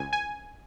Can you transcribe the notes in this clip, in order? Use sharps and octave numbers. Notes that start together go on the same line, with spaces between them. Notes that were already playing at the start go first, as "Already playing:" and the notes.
Already playing: C#2 G#5
G#5